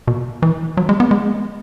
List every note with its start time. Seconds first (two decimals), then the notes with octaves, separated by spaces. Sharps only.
0.08 B2
0.42 E3
0.77 F#3
0.89 G#3
1.00 B3
1.11 G#3